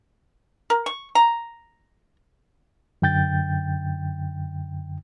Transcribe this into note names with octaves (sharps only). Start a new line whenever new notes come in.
A#4
C#6
A#5
F#2 D3 G5 G6 A6